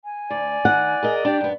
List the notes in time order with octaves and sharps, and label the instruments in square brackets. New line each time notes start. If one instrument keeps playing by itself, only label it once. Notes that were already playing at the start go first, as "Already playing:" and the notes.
[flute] G#5
[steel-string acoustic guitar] D2 [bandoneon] D5
[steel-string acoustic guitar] D#3 [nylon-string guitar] F#5
[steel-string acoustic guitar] G#4 A#4 D#5
[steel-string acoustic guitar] D4 G4 [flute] G5
[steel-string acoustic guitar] F#2 B3